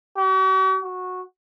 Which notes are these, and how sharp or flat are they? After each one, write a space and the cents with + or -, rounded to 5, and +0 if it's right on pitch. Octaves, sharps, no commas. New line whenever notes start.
F#4 +45
F#4 -15